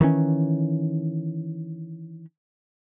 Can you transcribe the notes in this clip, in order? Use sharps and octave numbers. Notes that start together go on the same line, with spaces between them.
D#3 E3 B3 C#4